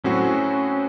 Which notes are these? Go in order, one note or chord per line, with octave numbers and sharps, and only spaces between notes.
A2 F#3 C4 C#4 F#4